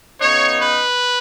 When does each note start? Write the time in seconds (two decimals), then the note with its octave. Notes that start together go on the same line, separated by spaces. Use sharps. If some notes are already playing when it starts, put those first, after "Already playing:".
0.19 C#3 B3 D#4 C#5
0.59 B4